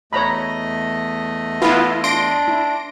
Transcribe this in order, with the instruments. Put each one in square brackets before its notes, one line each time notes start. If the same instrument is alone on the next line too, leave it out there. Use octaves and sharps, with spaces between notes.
[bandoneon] E2 A3 D#5 [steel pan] C#5 A#5 B5
[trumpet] B3 [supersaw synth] E4 F4 [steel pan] B4 F5
[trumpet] D4 [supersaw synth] C6 A#6 D7
[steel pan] E4